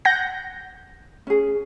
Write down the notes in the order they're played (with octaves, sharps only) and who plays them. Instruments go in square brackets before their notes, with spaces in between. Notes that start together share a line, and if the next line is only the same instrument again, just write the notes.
[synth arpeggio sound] F#5 G6 A#6
[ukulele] C#4 G#4